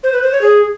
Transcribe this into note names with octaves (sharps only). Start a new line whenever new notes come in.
C5
B4
C5
C#5
G#4